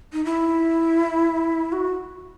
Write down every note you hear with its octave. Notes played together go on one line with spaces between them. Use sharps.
D#4
E4
F#4